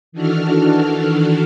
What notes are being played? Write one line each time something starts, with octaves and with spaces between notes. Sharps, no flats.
D#3 E3 D4 F#4 A4 F6